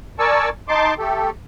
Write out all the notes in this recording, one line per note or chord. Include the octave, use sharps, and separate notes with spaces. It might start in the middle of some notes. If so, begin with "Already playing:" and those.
A#4 D5 G#5 A5 C#6 E6
D#4 A5 C6 D6
A3 G4 A4